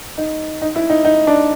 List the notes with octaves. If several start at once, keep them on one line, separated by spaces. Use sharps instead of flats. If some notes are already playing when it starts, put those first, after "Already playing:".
D#4
D#4
E4
D#4
D#4
D4